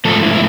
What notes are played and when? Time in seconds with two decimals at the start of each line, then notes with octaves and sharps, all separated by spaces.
0.05 G#2 F3 A3 A4
0.23 E4
0.33 E4